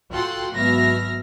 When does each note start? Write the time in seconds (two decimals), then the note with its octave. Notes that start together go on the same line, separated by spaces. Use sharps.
0.11 F4 F#4 A4 F#5 G5 C6
0.52 G#1 B2 F#3 E5 F6 A#6